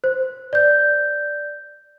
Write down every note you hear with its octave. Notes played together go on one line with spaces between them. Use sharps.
C5
D5 G6